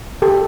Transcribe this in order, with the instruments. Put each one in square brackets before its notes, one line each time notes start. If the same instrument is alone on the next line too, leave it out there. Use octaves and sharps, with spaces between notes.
[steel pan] G4 A4